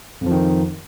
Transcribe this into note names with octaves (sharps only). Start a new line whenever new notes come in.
F2 D#3 F3